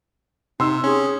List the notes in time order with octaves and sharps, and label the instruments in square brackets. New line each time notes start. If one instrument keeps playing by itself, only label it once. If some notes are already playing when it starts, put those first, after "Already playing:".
[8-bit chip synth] C3 [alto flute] D#4 [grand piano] C6 E6
[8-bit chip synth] C#4 [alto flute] G#4